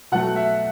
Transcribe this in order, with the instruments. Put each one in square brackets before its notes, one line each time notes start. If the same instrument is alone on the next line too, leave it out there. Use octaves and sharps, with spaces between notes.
[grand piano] B2 F#3 A3 F#5
E5